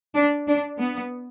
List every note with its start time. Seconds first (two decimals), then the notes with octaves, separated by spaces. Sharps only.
0.15 D4
0.47 D4
0.79 B3